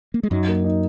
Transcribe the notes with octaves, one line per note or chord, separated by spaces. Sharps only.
A#3
G#3
F#2 F#3 D#4
A#3
D#4